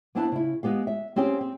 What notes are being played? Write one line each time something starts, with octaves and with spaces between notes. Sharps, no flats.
A#3 B3 D4 E4 C5 A5
C#3 E4
G#3 B3 G4 F5
E5
A#3 C4 C#4 G4 G#4 C5
C4